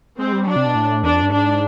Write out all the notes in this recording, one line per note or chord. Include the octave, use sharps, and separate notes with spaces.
G#3 C4
G3
F#3 D4
C3
B2
A2
E2 D4
F2
G2
G#2 D4